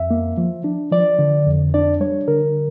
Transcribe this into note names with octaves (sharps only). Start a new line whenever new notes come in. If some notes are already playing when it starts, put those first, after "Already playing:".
Already playing: F2 E5
A#3
F3
D4
F3 D5
D3
F2
D4 D5
G3 C#5
D3 A#4